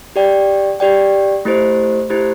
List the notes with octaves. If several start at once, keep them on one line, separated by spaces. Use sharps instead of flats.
G4 D5 G5
G4 D5 G5
A3 E4 G4 C5
A3 E4 G4 C5